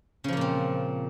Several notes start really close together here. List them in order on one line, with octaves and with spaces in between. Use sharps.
C#3 F3 A#3 A#2 C4